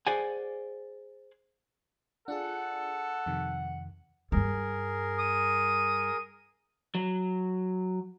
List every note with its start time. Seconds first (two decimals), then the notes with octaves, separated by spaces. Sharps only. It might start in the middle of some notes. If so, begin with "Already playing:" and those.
0.07 G#4 C5 D5 F#5 G#5
2.28 D4 F4 G#4 A4 F#5
3.26 F2 C3 D#3
4.32 G2 G3 G#4 A#4
5.19 D#6
6.95 F#3